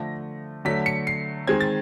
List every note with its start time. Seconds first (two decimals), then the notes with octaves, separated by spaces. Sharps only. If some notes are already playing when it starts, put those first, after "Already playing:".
Already playing: D3 F3 A3 A#6
0.65 D3 F#3 A3 B6
0.86 C#7
1.07 C7
1.47 D#3 G#3 C4 G#6
1.60 A6